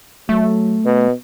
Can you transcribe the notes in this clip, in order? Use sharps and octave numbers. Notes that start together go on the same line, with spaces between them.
F#3 A3
B2